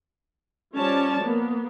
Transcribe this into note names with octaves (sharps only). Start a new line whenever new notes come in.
F3 G3 C#4 C#5 D5 A5
A#3 B3